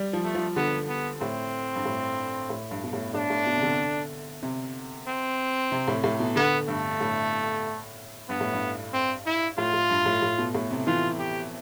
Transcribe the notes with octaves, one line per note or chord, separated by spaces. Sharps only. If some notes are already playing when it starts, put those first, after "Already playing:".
Already playing: G3
F3
A3
F3
D3 B3
B3
A2 C4
G2
A2
A2
G2
B2
A2
A2 D4
A2
B2
C3
D3
C3
C4
C3
A2
A2
B2
D3 B3
G2 A3
A2
G2 B3
A2
G2
C4
E4
A2 F4
A2
G2
A2
A2
B2
A2
C3
E3 F4
G4